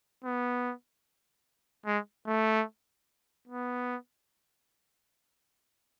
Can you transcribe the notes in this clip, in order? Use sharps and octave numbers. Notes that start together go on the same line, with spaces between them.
B3
G#3
A3
B3